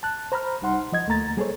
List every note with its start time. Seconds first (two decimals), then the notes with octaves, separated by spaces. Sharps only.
0.03 A5 F#6
0.32 C5 A#5 B5 F6
0.61 C2 G3 D#4 F#5 C6
0.92 F3 D#5 G#6
1.07 D2 A3 A#3 A#5 A6
1.37 G3 A#3 G#4 A4 C5 C#5